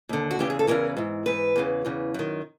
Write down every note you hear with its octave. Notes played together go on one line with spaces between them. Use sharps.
D#2 D3
F#4
E2 C#3 E3 G4
G#4
A4
E2 C#3 E3 A#4
G#2 E3
G#2 E3 B4
E2 C#3 E3
E2 C#3 E3
F#2 D#3